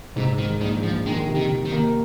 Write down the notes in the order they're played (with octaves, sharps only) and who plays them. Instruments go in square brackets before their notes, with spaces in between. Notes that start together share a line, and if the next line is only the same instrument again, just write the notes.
[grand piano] G#2 [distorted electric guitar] C3
[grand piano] G#2 [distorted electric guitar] D#3
[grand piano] A#1 [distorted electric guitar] D#3
[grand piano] A#1 [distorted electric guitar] F3
[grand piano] D#3 [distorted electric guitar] G#3
[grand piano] C3
[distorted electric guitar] D#3
[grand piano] C3
[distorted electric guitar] D#3
[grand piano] A#3